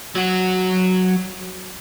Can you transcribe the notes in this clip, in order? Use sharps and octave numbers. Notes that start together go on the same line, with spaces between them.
F#3 F#4